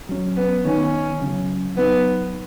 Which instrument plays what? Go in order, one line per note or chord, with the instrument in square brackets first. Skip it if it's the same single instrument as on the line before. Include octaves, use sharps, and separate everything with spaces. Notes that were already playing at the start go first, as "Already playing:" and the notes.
[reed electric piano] F#3 C#4
[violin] B3
[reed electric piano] D#3 B3 D#4 [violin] C#4
[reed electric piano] C#3 F#3 C#4
[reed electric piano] F#3 D#4 [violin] B3